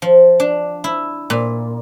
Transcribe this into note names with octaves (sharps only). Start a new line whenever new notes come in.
F3
D4
E4
A#2